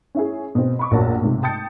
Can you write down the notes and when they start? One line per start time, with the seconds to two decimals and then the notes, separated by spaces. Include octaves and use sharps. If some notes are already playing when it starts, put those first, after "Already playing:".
0.15 C#4 E4 G#4
0.55 B2 C4
0.79 B5 C#6 D6
0.91 A#1 F#2 F#4 A#4 C#5 A5
1.21 B1 G#2 C3
1.43 G5 A5 D#6 G6 A6 C#7